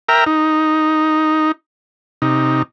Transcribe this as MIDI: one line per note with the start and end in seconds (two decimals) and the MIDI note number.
0.09 0.24 70
0.09 0.24 76
0.09 0.24 79
0.09 0.24 82
0.27 1.52 63
2.22 2.62 48
2.22 2.62 63